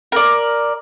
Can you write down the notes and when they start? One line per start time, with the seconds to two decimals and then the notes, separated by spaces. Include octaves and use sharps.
0.12 A#4 D5